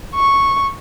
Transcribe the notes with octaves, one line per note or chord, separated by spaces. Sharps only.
C#6